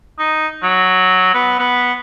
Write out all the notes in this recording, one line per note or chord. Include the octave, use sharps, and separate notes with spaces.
D#4
F#3
B3
B3